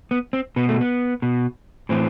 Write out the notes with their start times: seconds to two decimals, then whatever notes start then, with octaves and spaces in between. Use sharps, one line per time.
0.11 B3
0.33 C4
0.56 B2 B3
0.69 A3
0.81 B3
1.22 B2
1.89 A2 E3 C4